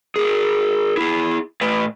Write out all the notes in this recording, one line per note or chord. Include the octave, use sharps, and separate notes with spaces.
G#4 A#4
E4 G#4
A2 B4